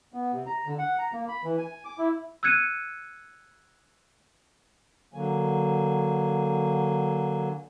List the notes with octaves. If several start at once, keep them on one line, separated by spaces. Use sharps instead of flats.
B3
C3
A#5
D3
F#5
A#5
A#3
B5
E3
G#5
D6
E4
E6 F#6 G#6 C#7 D#7
D3 F#3 A#3 G#5